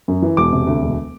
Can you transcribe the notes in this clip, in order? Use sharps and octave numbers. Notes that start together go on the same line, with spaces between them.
F#2
E3
E1 D6
C3
D2
E1